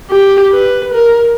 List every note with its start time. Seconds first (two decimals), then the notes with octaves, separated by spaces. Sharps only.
0.11 G4
0.53 B4
0.95 A#4